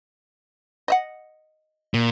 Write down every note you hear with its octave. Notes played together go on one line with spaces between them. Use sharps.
D#5 E5 F#5
A#2